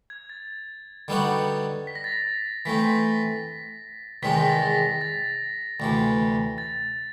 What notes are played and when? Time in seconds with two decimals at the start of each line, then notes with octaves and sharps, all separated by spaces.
0.10 G#6
0.30 A6
1.08 D3 G3 B3 D#4 F#4
1.87 B6
1.95 A#6
2.04 A6
2.12 A#6
2.66 E3 A3 C4 B6
4.23 E2 C3 D#3 G#3 C4 B6
4.36 A#6
4.49 A6
4.63 A#6
5.01 A6
5.80 D2 C3 E3
6.58 A6